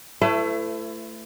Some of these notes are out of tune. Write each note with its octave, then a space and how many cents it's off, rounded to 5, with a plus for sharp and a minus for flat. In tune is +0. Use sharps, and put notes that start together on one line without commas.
A3 +10 E4 +30 B4 +45